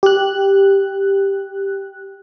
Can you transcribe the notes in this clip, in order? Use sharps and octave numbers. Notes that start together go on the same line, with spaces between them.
G4 F#6